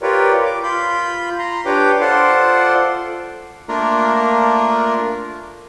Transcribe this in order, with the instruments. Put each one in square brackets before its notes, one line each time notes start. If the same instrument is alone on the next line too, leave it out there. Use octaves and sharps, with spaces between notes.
[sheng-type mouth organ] F4 G4 A#4 B4 C#5 D5
D6
F4 B5 G6
A#5 C6
D4 G4 B4 C#5 G5 D6
F4 A4 C5 D5 F#5 C6
[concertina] A3 A#3 D4 F4 A#4